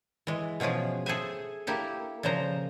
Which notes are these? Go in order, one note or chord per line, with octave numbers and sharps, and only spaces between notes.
E3 G#3
B2 F3 C#4 F4 G#4
G#4 A4 C5 E5 G#5
A#3 E4 G4 A4
A#2 C#3 F3 C5 A#5